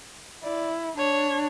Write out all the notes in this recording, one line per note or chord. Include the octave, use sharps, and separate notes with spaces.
E4 D5
D4 C#5